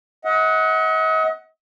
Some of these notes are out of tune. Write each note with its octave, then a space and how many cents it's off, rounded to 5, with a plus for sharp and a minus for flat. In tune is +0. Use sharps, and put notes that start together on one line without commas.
D#5 +40 F#5 +0